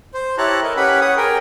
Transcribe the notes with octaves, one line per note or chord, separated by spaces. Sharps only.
C5
E4 G4 C#5 A5 A#5 F#6
A4 A#4 D#5
C#4 G4 B4 F#5 B5
C#5 F#5 D#6
G#4 A#4 G5